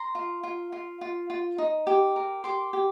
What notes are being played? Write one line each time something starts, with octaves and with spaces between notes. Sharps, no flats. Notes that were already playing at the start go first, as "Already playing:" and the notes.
Already playing: A#5 C6
F4
F4
F4
F4
F4
D#4
G4
A#4
G4 C6 D6
G4